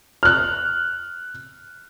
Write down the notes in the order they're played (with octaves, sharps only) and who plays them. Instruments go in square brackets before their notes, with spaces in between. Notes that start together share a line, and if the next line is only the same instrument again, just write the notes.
[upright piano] F6 F#6